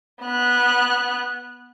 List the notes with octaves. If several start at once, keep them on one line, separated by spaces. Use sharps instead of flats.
B3 F#6